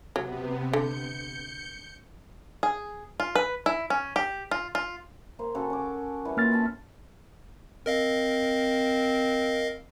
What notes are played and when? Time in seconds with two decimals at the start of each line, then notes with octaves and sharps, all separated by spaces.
0.16 C3 F#3 B3
0.73 D3 G6 C#7
2.63 G#4
3.20 F4
3.35 B4
3.66 E4
3.90 C#4
4.16 G4
4.51 F4
4.75 F4
5.39 A#3 C5
5.55 C#3 F#4 A4
5.70 C#4 D6
6.25 E3 G3 C#5
6.37 A#3 C#4 F4 F6 A6
6.51 E5 A5 B5
7.86 C4 A#4 D#5 F5